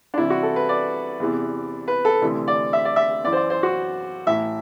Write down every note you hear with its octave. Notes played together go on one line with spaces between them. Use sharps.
D4
C2 C3 E3 E4
F#4
A4
B4
D5
E2 C3 E3
B4
A4
D2 C3 E3
D5
E5
D5
E5
F#2 E3 D5
C5
D5
C5
F#4
A1 A2 E3 E5